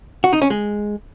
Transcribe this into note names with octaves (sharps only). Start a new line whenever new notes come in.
F#4
D#4
C#4
G#3